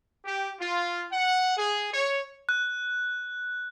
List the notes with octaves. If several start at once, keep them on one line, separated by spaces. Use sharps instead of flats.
G4
F4
F#5
G#4
C#5
F#6